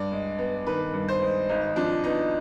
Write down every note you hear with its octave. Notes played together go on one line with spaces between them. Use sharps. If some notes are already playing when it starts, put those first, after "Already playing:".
Already playing: G2 D5
G#3
B3
D#3 B4
G2
C5
G#3
G#1 D#4
F3 D4
B3 D#4